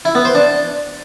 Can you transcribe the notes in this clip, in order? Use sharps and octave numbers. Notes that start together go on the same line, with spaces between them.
E4
B3
C5
D4